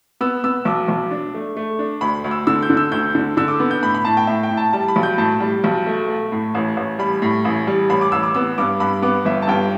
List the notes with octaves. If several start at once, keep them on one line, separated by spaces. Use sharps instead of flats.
B3 E6
B3 E6
B1 D6
B1
D4
A3
A3
D4
D2 B5
D2
E6
D3 E6
G6
D3
E6
D2 G6
D3
D3 E6
D6
B3
G6
A2 B5
B5
A2 A5
G5
A2 E5
G5
A2
A5
G3 A5
B5
B1
G6
A2 A5
G3
B1
A3
A3
A2
A1
A1
G3 B5
A2
A1
G3
A1 B5
D6
A1 E6
D6
B3 E6
G2 D6
G2 B5
B3 D6
G1 E5
A5
G2 G5